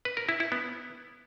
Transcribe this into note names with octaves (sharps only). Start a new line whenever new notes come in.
B4
A#4
E4
E4
B3